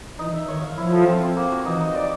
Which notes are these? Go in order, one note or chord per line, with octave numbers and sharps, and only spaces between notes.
E3 D#4
E5
D#3 C#5
F5
F3 E4
A4
C4
C4
A#3
F#4
E3 D#4
D#4
D5